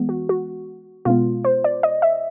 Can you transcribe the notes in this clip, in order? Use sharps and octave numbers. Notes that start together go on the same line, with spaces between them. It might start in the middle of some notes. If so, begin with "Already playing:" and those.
Already playing: E3 G#3 B3
F#4
F#4
B2 G#3 B3 F4
C5
D5
D#5
E5